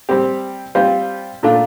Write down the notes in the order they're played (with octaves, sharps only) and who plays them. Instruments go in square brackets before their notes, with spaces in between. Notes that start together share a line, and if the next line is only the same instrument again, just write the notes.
[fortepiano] G3 C4 G4
G3 C4 F4 C5
A#2 A3 D4 F4